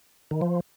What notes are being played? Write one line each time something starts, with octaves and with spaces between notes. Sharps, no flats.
D#3
F3